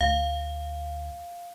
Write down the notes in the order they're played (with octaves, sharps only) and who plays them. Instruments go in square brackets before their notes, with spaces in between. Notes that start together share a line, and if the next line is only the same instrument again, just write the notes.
[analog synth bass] D2 [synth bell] F5